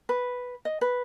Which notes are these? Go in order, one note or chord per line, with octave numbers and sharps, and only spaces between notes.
B4
D#5
B4